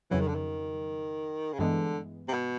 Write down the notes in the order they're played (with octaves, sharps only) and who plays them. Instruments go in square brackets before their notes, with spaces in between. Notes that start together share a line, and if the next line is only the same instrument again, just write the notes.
[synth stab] F2 C#3 F#3 [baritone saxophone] E3
[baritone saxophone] D#3
D3
D#3
C#3
[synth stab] G2 E3 G#3 B3 [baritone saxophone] D3
[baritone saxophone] C3
B2